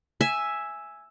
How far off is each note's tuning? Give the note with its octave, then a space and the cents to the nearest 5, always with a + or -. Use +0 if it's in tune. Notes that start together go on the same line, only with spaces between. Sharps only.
E5 +0 G#5 +0